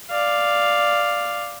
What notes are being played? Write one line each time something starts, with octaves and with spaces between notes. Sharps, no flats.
D5 F5